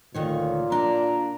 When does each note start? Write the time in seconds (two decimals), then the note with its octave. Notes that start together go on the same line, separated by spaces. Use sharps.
0.14 D2 A#2 D#3 C#5
0.72 D4 A#5